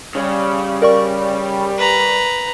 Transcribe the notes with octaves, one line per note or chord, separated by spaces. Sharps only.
C#3 G3
A#4 D5 C#6
B4 A#5